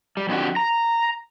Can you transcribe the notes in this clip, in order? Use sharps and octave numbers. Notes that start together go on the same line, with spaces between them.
G3
F2 D3 A#3 F#4 G4
A#5